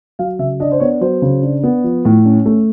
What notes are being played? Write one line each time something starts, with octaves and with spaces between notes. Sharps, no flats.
F#3 F5
C#3 E5
D4 D#5
C5
B3 C#5
F#3 C5
C#3
D4
B3
F3
A2
C#4
A3